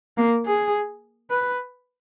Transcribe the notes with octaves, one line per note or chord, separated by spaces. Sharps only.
A#3
G#4
B4